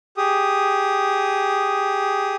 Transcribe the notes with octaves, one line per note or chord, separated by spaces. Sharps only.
G4 G#4 D#6